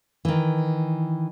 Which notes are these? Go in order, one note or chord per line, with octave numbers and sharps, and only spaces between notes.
D#3 E3